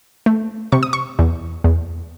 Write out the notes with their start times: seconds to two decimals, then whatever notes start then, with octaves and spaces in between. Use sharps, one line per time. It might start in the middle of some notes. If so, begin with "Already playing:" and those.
0.26 A3
0.72 C3 C#6
0.83 D#6
0.93 C#6
1.19 E2
1.64 E2